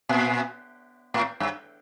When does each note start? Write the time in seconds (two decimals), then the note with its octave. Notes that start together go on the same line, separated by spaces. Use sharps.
0.09 A#2
1.14 A2
1.40 G2